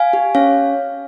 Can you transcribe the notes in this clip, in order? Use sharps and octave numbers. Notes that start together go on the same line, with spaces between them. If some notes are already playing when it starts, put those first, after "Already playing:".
Already playing: F5 G#5
G4
C#4 C#5 F5